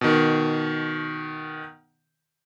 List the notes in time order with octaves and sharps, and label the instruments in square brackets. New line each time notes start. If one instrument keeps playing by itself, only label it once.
[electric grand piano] B2 D#3